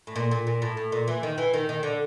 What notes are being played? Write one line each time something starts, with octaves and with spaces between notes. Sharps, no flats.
A2
A#2
A#2
A#2
A2
A2
A#2
E3
D#3
E3
D#3
D#3
D3